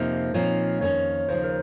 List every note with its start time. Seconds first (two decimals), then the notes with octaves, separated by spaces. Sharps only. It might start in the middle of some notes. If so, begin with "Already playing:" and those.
Already playing: F2 C3 F3 A#3 D#4 C5
0.34 A#2 F3 C4 D#4 C#5
0.81 F2 D#3 A#3 C#4 C#5
1.28 D#2 C#3 F3 C5
1.44 A#4